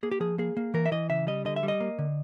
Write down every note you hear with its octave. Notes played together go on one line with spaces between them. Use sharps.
A#3 G#4
G4
F3 G#4
A#3 G#4
A#3
E3 A#4
E5
E3 D#5
C#3 E5
G3 D#5
D3 D#5
E5
G3
D#5
A#3
D3